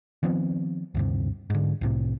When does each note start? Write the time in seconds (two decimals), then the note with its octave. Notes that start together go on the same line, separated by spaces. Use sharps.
0.23 D#3 F3 B3 C4
0.95 D2 G2 C3
1.50 G#2 D3
1.81 C2 A2 C3